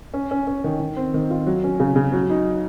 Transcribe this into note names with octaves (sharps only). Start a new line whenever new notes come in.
C#4
C#4
C#4
D#3
D#3
C4
D#3
F4
F#3
C#4
C#3
C#3
F#3
D#4